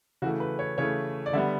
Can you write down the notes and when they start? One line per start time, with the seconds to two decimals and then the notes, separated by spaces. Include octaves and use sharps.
0.22 C#3 E3 A3 F#4
0.40 B4
0.59 C#5
0.78 C#3 E3 A3 C#5
1.26 D5
1.33 D3 G3 B3 E5